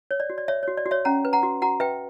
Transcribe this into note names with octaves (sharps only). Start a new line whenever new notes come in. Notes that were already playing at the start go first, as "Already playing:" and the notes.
C#5
D5
F#4
D5
C#5 E5
F#4 C#5
D5
F#4
C#5 E5
C#4 F#5 A#5
B4
F#5 A#5
F#4
F#4 F#5 A#5
B4 E5 G5